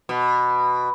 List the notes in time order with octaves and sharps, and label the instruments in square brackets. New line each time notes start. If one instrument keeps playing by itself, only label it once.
[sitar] B2